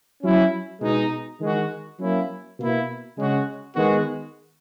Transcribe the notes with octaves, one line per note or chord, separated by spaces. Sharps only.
F#3 C#4 E4
B2 G#3 D#4
D#3 G#3 D#4 F#4
F#3 A#3 C#4 E4
B2 A#3 E4
C#3 G#3 C#4 F#4
D#3 G#3 B3 F#4